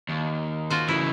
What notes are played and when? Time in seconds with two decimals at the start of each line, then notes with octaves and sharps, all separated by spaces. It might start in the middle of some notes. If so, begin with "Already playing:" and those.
0.09 D#2
0.70 F4 F#4 C5
0.88 C#3 E3 E4